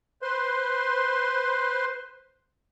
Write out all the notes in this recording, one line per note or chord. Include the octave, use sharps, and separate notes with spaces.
B4 C5 C6